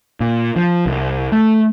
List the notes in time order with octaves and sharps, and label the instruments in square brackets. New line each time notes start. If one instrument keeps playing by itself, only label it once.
[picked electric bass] A#2
F3
C2
A3